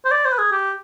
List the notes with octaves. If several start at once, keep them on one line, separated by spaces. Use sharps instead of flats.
C5
D5
C5
B4
G#4
G4